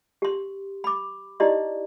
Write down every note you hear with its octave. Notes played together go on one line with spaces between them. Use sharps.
G4 C6
B5 D6
D#4 E4 G4 D5 D#5 C6